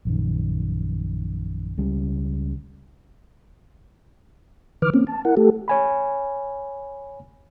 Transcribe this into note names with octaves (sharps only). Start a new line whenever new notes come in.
A#1 F#2 D#3
C#2 C#3 G3
D#3 E3 B4 D6 F6
A#3 C4 C#4
A5
E4 A#4 F#5
A3 G4 A4
C#5 G#5 B5